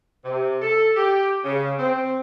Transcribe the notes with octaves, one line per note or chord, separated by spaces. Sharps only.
C3
A4
G4
C#3
C4